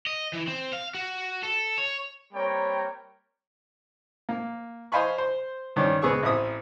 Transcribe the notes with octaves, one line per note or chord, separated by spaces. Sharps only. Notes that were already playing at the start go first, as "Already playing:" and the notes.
D#5
E3
C4
F5
F#4
A4
C#5
G3 A#3 C4 C#5 G5 A#5
A#3
C5 D#5 F5 G#5 B5 C#6
C5
G2 D#3 C#4 D4
C#2 B3 G#4 C#6 E6
A1 C4 E5 D#6